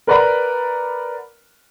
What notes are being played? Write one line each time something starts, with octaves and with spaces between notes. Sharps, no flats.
A#4 B4 D5 F#5 A#5 B5